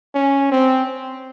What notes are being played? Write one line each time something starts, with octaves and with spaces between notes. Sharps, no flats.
C#4
C4